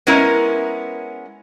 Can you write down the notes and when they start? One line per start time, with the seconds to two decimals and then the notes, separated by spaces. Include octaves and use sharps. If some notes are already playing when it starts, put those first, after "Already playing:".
0.07 G#3 B3 C#4 E4 A#4